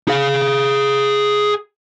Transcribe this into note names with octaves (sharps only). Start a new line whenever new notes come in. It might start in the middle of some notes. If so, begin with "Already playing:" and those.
G#4 F5